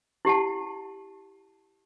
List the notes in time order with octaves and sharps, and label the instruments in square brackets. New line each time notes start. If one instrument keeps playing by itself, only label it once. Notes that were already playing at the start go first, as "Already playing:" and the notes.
[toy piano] E4 G4 F#5 A5